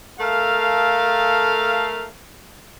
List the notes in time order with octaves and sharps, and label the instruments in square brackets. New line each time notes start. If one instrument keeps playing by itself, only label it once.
[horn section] A3 A4 A#4 F5